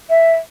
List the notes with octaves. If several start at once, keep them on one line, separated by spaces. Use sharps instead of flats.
E5